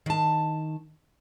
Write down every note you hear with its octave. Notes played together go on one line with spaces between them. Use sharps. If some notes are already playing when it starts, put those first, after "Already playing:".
D#3 A5